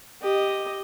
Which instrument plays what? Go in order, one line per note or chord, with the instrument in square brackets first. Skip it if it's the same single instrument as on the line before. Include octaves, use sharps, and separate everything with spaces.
[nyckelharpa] G4 D#5